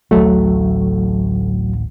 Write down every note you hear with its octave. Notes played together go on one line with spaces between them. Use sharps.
D1 A1 D2 F#3 A3